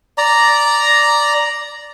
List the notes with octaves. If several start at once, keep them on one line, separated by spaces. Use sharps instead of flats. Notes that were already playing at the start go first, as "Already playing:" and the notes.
D5 A#5